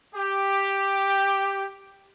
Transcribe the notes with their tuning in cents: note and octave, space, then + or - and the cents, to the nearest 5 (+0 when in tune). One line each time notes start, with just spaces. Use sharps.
G4 +5